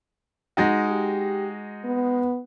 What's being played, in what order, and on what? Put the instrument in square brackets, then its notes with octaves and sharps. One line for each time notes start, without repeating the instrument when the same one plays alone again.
[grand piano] G#3 D#4 F#4
[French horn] G4
B3